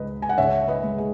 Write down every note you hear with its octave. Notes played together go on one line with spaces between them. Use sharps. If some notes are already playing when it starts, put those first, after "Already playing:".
Already playing: C#2 G#3 B4 D#5
G#5
F#5
C#2 C#5 E5
B4 D#5
G#3
G#4